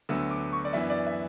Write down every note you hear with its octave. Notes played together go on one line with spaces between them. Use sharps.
D2 D3 F#3 B3 E6
D6
C#6
D5
F#2 E3 B3 D4 E5
D5
E5